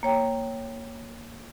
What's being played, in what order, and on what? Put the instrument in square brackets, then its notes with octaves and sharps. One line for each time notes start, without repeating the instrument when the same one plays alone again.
[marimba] A#3 C#5 G5 A#5